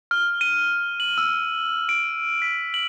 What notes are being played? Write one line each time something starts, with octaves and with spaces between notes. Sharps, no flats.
F6
D#7
F#7
E6
D7
B6
F#7